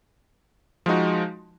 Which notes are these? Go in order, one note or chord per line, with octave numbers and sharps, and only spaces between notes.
F3 G#3 D#4 F#4